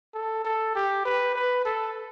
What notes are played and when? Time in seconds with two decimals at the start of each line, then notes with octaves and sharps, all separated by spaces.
0.14 A4
0.44 A4
0.75 G4
1.05 B4
1.35 B4
1.65 A4